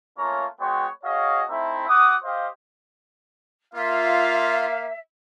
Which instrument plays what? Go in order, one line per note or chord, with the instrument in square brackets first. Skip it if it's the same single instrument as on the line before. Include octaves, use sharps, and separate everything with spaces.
[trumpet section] A3 A#3 C#4 F4 C#5 A#5
G#3 B3 F#4 C#5 G5 C6
F#4 G#4 C#5 D#5 F5
A3 C4 D#4 E4 E5
F#4 F#5 D6 D#6
G4 C5 D#5 F5
[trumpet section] A#3 F5 [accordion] F4 [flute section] E5